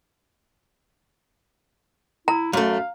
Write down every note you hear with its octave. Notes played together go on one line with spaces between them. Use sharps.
E4 A#5
F#2 A3 F5